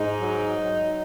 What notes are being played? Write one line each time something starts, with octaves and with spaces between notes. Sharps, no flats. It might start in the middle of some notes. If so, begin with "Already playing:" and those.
Already playing: G#2 D#4
F#3
F#3